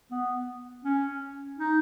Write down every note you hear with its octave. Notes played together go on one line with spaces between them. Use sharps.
B3
C#4
D#4